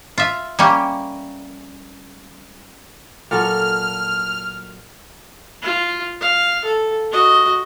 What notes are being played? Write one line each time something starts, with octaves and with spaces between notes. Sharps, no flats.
F4 E5
G3 A#3 C#4 G4
A#2 F#3 A4 F6
F4
F5
A4
F#4 D#5